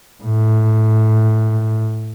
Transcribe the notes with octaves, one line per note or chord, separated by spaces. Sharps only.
A2